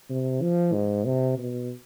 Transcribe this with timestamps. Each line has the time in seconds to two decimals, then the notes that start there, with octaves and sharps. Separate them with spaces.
0.10 C3
0.42 F3
0.73 G#2
1.05 C3
1.38 B2